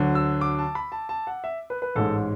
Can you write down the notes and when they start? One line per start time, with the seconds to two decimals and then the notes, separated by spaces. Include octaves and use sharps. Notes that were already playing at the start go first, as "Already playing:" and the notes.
Already playing: D2 D3 F#3
0.15 E6
0.41 D6
0.59 A5
0.75 B5
0.92 A5
1.09 A5
1.27 F#5
1.44 E5
1.70 B4
1.82 B4
1.95 A1 G#2 G#3 A4